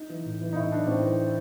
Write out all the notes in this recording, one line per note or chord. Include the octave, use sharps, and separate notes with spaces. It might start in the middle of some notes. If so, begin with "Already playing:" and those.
Already playing: D#4
E3
A2
E3
D#4
A2 E4
E3 D4
A2 C4
E3